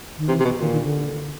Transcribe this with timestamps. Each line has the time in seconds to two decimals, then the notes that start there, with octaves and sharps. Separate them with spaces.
0.18 D#3
0.28 C3 E3
0.40 C3
0.45 B2
0.61 A#2 D#3
0.72 D#3
0.83 D3